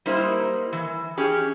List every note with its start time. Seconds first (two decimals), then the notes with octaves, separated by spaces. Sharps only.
0.06 G3 A#3 D#4 E4 C5
0.73 E3
1.17 C#4 G4 G#4